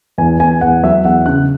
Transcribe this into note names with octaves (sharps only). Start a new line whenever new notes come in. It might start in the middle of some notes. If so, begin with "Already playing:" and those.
E2 G#5
E2 G#5
E2 F#5
F#3 E5
E2 F#5
C#3 F#6